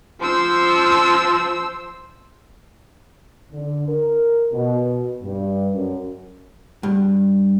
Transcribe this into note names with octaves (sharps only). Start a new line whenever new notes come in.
F3 C5 E6
D3
A#4
B2
G2
F#2
G2